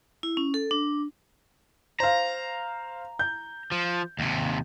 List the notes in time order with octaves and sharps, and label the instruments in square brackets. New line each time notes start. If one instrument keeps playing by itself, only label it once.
[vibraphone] E4
C#4
A4
D4
[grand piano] C5 F5 [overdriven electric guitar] A#5
[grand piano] G6
[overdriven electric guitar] F3
D#2 C3